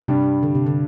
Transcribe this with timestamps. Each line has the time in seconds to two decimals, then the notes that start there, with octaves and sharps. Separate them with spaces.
0.08 G2 C3 G3 D4
0.43 D3
0.55 C3
0.66 D3